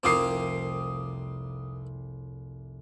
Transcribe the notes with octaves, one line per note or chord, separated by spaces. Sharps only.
F1 C2 C4 F4 A#4 D6 D#6 C7